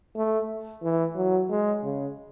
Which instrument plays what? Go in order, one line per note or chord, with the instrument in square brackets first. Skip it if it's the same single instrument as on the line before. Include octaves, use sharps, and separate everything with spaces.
[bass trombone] A3
E3
F#3
G#3
C#3